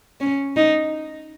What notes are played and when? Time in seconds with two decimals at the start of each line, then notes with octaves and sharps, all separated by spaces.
0.21 C#4
0.56 D#4